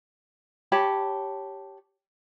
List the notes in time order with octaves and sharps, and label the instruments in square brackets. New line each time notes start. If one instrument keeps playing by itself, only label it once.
[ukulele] G4 C#5 A5 B5